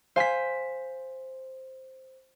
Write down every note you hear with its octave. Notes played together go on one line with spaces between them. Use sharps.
C5 F5 G#5 B6